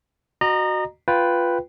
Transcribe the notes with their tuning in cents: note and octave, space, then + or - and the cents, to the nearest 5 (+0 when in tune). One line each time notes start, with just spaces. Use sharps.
F#4 +0 D#5 -35 A#5 +0
F4 +0 B4 +0 G5 +0